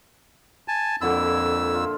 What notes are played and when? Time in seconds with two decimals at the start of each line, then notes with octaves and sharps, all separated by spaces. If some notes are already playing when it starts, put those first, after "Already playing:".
0.68 G#5 A5
1.01 F2 A#2 D3 E4 E6
1.74 F4